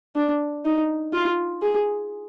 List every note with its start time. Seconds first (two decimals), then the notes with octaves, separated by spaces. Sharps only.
0.15 D4
0.64 D#4
1.13 F4
1.62 G#4